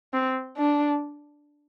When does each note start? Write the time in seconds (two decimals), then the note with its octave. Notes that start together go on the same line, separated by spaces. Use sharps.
0.13 C4
0.57 D4